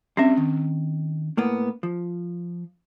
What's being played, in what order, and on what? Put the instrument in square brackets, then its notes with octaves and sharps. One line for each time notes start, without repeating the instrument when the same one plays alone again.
[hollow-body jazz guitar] G3 E5 [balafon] C4 C#4
[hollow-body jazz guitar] D#3
A2 A#3 B3
F3